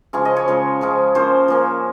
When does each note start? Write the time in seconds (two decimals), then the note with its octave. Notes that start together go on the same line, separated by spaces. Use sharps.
0.13 C#3 F3 G#3 C#4 C#6
0.25 D#5
0.36 C#5
0.48 C#3 F3 G#3 C#4
0.81 C#3 F3 G#3 C#4
1.15 F3 A#3 C#4 C5
1.48 F3 A#3 C#4